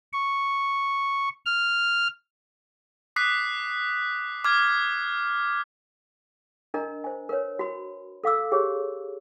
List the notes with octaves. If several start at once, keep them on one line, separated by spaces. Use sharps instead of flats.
C#6
F6
D6 D#6 F#6 B6 C7
D6 F6 G#6
D4 A#4 D#5 A#5
C5 G#5
A#4 B4 C#5
F#4 B5
A4 F5 D6 E6
G4 G#4 C#5